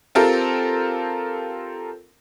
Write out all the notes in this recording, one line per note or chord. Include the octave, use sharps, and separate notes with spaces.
C4 F4 G4 A4 A#4